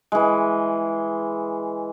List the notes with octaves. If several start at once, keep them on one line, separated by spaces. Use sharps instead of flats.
E3 G#3